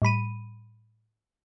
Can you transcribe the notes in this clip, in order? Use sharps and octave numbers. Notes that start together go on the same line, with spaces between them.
A2 G3 B5 D#7